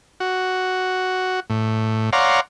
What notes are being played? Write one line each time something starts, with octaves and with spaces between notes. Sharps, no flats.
F#4
A2
C#5 D5 F5 F#5 A#5 C6